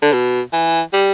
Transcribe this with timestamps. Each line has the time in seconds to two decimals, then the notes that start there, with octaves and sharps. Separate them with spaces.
0.02 D3
0.13 B2
0.53 E3
0.93 G3